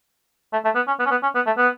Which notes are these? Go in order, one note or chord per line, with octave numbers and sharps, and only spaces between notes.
A3
A3
B3
C#4
B3
C#4
B3
C#4
B3
A3
B3